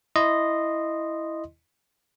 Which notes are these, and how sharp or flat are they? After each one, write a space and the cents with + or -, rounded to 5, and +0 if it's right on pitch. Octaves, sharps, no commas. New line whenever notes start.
E4 +0 D#5 -10 C6 -5